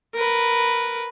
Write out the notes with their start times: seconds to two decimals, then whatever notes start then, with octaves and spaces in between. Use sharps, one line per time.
0.15 A#4 B4